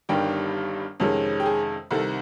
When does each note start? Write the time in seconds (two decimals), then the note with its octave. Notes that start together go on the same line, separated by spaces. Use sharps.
0.09 G1 G2 D#3 G3 G4
1.00 F2 C3 D#3 G#3 C#4
1.40 G4
1.46 G#4
1.91 C2 C3 D#3 A4